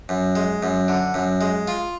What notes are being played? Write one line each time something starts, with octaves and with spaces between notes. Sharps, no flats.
F#2
G#3
F#2
D3
F#2
G#3
F4